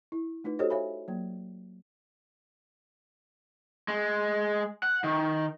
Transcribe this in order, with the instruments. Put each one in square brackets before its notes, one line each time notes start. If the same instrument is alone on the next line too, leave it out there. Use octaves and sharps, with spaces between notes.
[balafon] E4
A3 D#4 F4 B4
F#4 G4 A4 C5 C#5 D#5
C#5 E5 F5 G#5 B5
F#3 A#3
[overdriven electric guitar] G#3
F#5
D#3